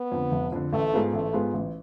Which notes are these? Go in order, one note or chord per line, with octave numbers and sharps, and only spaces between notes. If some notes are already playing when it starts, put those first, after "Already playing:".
Already playing: B3
F2 D3
F1
F2 D3
A1 A3
G#2 G#3 B3 F4
A1 A3
G#2 G#3 B3 F4
A1